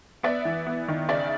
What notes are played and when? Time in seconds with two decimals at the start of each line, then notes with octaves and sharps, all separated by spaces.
0.23 B3 D5 E5
0.45 E3
0.66 B3
0.88 D#3
1.09 C#3 D5 E5